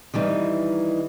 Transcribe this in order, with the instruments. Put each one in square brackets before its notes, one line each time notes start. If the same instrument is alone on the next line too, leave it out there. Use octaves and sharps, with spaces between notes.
[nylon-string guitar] D#3 E3 G3 D#4